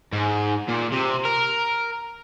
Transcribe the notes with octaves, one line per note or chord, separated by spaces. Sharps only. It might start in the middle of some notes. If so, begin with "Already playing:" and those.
G#2
A#2
C3
A#4